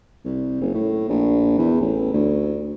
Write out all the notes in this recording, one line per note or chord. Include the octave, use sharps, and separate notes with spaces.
C2
F#1
A2
A#1
E2
A1
D2